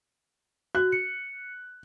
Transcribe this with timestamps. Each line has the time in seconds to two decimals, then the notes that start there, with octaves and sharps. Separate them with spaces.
0.75 F#4 F#6
0.92 C#7